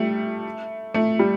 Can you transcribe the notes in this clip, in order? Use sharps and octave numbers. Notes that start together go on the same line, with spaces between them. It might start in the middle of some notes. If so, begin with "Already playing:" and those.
Already playing: G3 A3
A3
G3